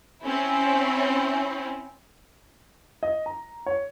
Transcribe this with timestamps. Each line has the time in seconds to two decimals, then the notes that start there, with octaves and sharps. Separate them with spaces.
0.23 C4 C#4 E4
3.03 D#5
3.26 A#5
3.66 C#5